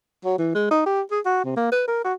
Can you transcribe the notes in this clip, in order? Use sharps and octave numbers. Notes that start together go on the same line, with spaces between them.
F#3
E3
G#3
D#4
G4
G#4
F#4
C3
A#3
B4
A#4
F#4